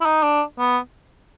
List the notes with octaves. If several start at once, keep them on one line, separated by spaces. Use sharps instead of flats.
E4
D#4
D4
B3